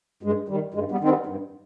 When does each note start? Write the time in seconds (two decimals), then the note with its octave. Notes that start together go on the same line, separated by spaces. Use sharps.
0.23 G2 G#3
0.48 D#3 G3
0.74 G2 G#3
0.91 G3 B3
1.00 D#3 C4
1.09 G3 B3
1.26 G2